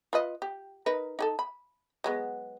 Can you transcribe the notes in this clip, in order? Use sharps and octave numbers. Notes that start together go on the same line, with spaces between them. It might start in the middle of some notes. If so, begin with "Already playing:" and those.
F4 B4 D#5
G4
D#4 A#4 B4
D#4 G#4 A4
B5
F#3 G#3 B3